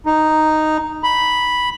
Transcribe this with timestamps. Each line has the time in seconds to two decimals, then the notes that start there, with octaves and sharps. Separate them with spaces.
0.06 D#4
1.03 B5